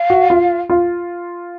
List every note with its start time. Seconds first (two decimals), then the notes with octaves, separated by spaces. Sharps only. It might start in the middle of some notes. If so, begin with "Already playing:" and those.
Already playing: F5
0.10 F#4
0.30 F4
0.70 F4